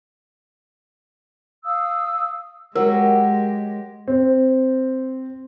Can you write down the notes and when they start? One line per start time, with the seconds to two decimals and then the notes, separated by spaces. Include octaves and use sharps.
1.65 F5 D#6 E6
2.75 F#3 G#3 G4 A#4
4.08 C4